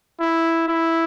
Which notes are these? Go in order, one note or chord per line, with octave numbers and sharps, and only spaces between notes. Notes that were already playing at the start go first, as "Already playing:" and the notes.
E4
E4